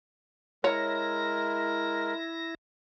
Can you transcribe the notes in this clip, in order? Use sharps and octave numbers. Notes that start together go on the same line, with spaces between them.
G#3 E4 A#4 C#5 A#6